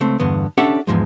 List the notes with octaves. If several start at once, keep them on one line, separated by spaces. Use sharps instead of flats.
C#2 A3 C4
E2 G2 D3 B3
C#4 D4 G4 A4 E5 F#5
E2 G#2 F3 G#3